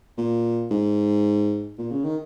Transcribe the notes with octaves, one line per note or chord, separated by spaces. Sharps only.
A#2
G#2
A#2
C#3
D#3